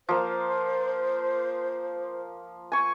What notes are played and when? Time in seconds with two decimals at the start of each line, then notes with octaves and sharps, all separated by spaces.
0.09 F3 A#3 C5
2.72 G#5 C#6